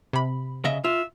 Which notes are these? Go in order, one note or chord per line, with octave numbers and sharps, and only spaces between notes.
C3 B5
C#3 D#5 E5
F4 E5